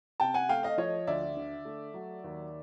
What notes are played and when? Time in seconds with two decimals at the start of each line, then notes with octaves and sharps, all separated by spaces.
0.20 C3 G5 A5
0.34 F#5 G#5
0.49 A3 F5 G5
0.63 D#5 F5
0.78 F3 C#5 D#5
1.07 D2 D5 E5
1.37 D3
1.65 A3
1.94 F#3
2.24 D#2